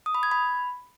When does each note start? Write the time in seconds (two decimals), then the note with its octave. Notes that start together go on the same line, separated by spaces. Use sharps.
0.06 D#6
0.15 B5
0.23 G#6
0.31 B5